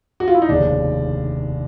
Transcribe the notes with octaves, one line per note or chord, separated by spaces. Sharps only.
F#4
F4
E4
D#4
F1 D#2 C#3 D4